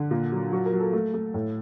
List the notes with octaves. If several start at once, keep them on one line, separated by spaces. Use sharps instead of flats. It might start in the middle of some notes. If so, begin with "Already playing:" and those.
Already playing: D3
A#2
F#3
F#3 F#4
A#4
F#3
A4
A3
A3
A2